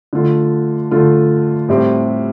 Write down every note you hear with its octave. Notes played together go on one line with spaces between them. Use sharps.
D3 A3 F4
D3 A3 F4
A2 G3 C4 G4